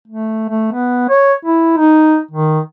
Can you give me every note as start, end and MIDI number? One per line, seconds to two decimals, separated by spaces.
0.08 0.46 57
0.50 0.70 57
0.73 1.07 59
1.09 1.34 73
1.45 1.73 64
1.78 2.18 63
2.31 2.60 51